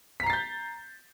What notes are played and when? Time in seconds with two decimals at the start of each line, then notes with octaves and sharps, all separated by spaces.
0.20 B6
0.23 A#5
0.26 C7
0.30 A6
0.33 G6